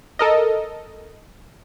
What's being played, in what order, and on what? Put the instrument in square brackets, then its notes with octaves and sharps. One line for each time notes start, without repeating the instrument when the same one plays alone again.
[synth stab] A4 A#4 D#5